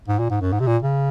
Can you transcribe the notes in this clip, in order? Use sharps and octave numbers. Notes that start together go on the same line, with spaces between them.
G#2
A#2
G#2
F#2
G#2
C3
A#2
C#3